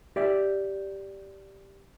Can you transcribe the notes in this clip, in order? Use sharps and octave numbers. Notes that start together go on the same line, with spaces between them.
G4 D5 E5